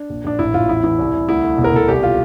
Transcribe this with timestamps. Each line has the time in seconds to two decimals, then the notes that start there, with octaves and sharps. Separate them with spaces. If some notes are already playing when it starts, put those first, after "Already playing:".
Already playing: D4
0.10 A#1
0.24 A#1 D4
0.39 A1 E4
0.54 A1 F4
0.69 E2 E4
0.84 E3 E4
0.99 C2
1.14 C2
1.29 D2 E4
1.44 D2
1.58 E1
1.64 A#4
1.73 E1 A4
1.88 C2 G4
2.03 F4